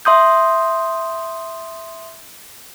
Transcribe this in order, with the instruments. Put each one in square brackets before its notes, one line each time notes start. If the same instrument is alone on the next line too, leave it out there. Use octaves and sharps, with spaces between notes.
[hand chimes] E5 C6 D#6 G6